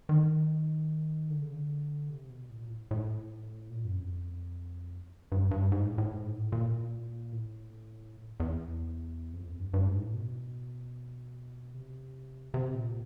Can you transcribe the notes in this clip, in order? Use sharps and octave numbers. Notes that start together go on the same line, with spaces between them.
D#3
D3
C#3
D3
C3
B2
A2
A#2
A2
A2
A#2
F#2
F2
G2
G2
G#2
A2
A2
G#2
A2
A#2
A2
E2
F2
E2
F2
G2
G2
G#2
A2
B2
C3
C3
A#2